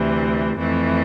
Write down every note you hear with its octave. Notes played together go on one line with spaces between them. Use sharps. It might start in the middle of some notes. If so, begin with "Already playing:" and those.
Already playing: D2 C3 E3
F2 E3 A3